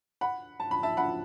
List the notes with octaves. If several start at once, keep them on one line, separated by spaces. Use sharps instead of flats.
F#5 B5
A5
B5
E5 A5
F#5 B5